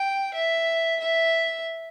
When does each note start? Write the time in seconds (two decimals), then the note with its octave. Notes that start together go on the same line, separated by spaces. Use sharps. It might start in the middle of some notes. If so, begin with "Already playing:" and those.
Already playing: G5
0.34 E5
1.00 E5